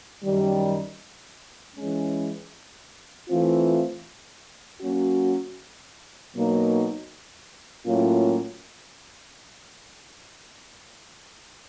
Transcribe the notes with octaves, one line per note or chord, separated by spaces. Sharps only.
F#2 D#3 G3
E3 G#3 C#4
E3 A3 C4 F4
F#3 A#3 C#4 F#4
B2 F#3 A#3 D#4
A2 F#3 A#3 C#4 F4